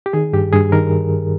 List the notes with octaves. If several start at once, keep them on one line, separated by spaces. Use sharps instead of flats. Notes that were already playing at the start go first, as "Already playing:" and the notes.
G4
D#3 G#4
G2 G4
G2 G#4
D#3 A#4